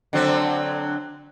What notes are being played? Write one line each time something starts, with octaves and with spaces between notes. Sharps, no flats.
D3 F#3 C4